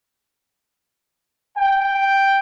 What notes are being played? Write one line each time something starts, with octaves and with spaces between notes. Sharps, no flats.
G5